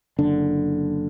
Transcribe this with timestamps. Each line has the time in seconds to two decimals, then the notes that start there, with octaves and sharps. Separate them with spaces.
0.19 F#1 D3 D4